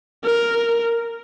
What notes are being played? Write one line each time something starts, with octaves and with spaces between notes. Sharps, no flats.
A#4